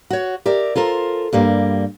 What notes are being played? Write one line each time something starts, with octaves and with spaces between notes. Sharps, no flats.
F#4 C#5
G4 A#4 D5 E5
F4 A4 A#4 C5
G2 G3 A#3